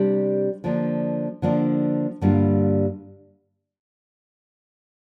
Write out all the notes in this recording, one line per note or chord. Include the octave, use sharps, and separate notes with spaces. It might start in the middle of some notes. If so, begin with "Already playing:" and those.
Already playing: C3 G3 D4 G4
D3 F3 A#3 D4
D3 F3 A#3 D4
G2 D3 G3 A#3 F4